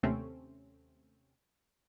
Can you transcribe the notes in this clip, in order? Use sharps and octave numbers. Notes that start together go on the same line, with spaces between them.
D#2 C3 A3 C4 C#4